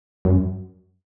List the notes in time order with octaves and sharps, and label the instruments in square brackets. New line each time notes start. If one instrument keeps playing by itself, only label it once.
[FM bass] F#2